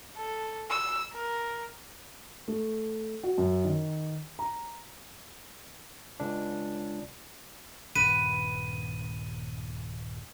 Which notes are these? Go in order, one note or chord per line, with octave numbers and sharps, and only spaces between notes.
A4
E6
A#4
A3
F#4
F#2
D#3
A#5
C#2 D4
D#1 G2 C#3 B4 D#7